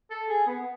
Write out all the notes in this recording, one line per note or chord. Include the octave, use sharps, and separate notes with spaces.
A4
G#4
B3